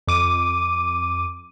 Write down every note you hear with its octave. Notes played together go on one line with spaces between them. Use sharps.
F2 D6 D#7